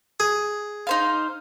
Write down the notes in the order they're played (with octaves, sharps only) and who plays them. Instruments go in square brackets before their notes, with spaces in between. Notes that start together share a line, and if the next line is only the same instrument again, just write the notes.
[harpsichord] G#4
[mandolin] D#4 C5 F5